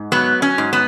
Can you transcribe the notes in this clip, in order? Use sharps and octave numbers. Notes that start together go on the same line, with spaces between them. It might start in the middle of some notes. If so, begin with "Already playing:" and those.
Already playing: G#2
F#3 B3
C#4
G#2
B3